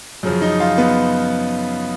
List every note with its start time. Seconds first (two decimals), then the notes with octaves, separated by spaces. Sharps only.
0.23 F#2 C#3 F3
0.42 D#4
0.60 F4
0.78 B3